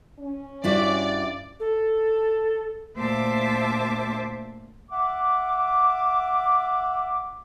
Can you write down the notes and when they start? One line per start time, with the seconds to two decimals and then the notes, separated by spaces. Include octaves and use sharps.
0.20 C#4
0.64 G2 E4 F#4 D5
1.60 A4
2.97 D2 A#2 C5 E5 A5 D6
4.91 E5 F#5 D6